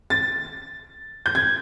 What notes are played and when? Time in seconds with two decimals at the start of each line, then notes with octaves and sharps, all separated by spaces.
0.10 A6
1.26 G6
1.35 G#6